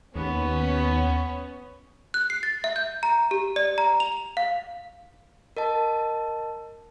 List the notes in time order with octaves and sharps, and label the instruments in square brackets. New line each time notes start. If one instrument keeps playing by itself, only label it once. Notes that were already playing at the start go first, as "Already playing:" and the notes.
[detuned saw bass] D#2 [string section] B3 C#4
[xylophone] F#6
C7
A6
E5
G6
A#5
G4
D5
A#5
F7
F5
[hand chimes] A#4 D#5 A5